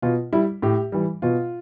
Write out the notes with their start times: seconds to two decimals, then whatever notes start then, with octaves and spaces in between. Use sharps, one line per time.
0.02 B2 F4
0.33 G3 E4
0.62 A2 G4
0.92 E3 G3
1.22 B2 F4